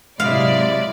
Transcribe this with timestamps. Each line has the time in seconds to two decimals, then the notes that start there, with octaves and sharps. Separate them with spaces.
0.20 G#2 C3 F#3 G#3 E4 D5 F5